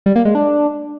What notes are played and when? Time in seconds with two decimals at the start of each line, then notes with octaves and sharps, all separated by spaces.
0.06 G3
0.16 A#3
0.25 G#3
0.35 D4